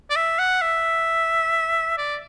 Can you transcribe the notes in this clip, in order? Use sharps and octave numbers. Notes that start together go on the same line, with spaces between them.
D5
E5
F#5
E5
D5